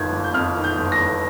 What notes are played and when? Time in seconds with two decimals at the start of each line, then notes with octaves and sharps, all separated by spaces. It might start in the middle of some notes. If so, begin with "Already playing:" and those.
Already playing: G1 F2 D#3 G6 G#6
0.12 G1
0.24 G6
0.34 F2 F6
0.56 D#3
0.64 G6
0.78 G1
0.92 A#6
1.00 G1